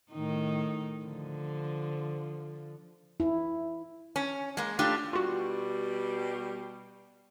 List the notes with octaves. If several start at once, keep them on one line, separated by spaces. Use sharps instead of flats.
A2 D#3 D#4
D3 F3
E4
C#4
G#3 A#3
A3 D4 F4 G4
B2 G3 F4 F#4